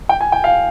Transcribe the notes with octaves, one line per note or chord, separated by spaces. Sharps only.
G5
G#5
G5
F5